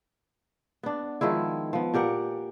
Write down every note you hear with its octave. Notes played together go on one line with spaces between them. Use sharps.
B3 D4
D#3 F3 G#3 E4
F3 B3
A#2 G4 A#4 F#5